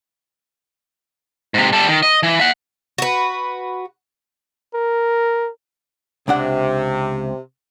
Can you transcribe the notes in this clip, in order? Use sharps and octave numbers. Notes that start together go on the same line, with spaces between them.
G#2 C3
G3 A4
D#3
D#5
E3
E5 F#5
F#4 B4
A#4
C#2 C3 D4 F#5